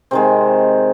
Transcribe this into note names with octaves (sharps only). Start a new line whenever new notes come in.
C3 D#3 G#3 C4